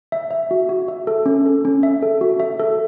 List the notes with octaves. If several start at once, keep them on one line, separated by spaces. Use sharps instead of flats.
E5
E5
F#4
F#4
E5
A4
C#4
A4
C#4
E5
A4
F#4
E5
A4